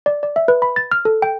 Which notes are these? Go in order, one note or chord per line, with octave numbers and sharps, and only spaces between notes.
D5
D5
E5
B4
B5
A6
F6
A4
G5